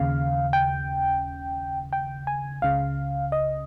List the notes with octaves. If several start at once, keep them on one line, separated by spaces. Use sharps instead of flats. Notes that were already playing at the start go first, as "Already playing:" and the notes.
Already playing: D#2 C#3 F5
G5
G5
G#5
C#2 C#3 F5
D#5